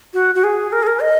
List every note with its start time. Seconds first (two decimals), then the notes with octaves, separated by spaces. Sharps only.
0.14 F#4
0.35 F#4
0.44 G#4
0.72 A#4
0.83 G#4
0.87 A#4
1.02 D#5